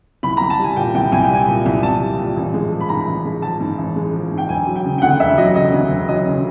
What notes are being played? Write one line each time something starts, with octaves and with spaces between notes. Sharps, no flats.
C2 B5
C2 A#5
A5
G3 G#5
A#2 G5
C2 G5
C2 G#5
G5
G3 G#5
A#2
C2
C2 A5
G3
A#2
A1
G#3
F3
B5
G#2 A#5
A1
G#3
F3 A5
G#2
A1
G#3
F3
G#2
G5
E1 G#5
F#3
G5
C#3
G5
D2 F#5
E1 E5
F#3 D#5
C#3 D#5
D2
E1
F#3 D#5
C#3